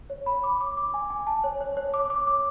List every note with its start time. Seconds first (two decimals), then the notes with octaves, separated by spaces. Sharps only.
0.10 C#5
0.26 B5
0.43 D6
0.61 D6
0.77 D6
0.94 G#5
1.10 G#5
1.27 A5
1.44 C#5
1.61 C#5
1.77 C#5
1.94 D6
2.10 D6
2.27 D6